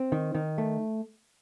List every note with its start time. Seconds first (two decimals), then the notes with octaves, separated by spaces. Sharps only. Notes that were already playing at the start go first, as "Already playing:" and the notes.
Already playing: C4
0.12 D#3
0.35 D#3
0.58 A3